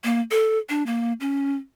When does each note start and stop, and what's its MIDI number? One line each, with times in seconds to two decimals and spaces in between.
0.04 0.21 58
0.31 0.58 69
0.69 0.85 62
0.86 1.13 58
1.20 1.56 61